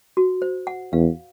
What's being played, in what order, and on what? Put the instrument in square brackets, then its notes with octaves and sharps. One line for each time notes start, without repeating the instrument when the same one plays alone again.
[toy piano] F#4
C5
F#5
[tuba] E2 [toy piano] F5